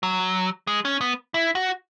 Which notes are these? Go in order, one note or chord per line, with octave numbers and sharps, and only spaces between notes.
F#3
G#3
C#4
B3
E4
F#4